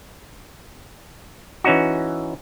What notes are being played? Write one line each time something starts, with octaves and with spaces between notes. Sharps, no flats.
E3 C#4 D#4 F#4